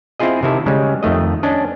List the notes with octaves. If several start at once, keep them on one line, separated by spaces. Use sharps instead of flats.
C4 E4 F4 G#4 D#5
C3 D#3 E4 A4
C#3 G3 G#3
F2 D#3 A3 D#5
C#4 D4 D#5